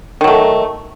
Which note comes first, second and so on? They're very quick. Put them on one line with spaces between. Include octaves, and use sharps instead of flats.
D#3 F#3 A3